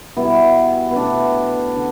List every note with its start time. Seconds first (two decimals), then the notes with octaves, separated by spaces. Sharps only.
0.17 B2 G3 B3 E4
0.91 B3
0.96 B2 A3 D4
1.76 D3